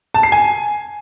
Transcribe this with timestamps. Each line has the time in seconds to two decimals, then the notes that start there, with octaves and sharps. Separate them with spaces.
0.14 A5
0.23 C7
0.32 G#5